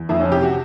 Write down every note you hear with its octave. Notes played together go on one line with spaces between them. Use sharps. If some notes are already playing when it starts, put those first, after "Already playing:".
Already playing: E2
F2 E4
C#4
C3 G4
F#4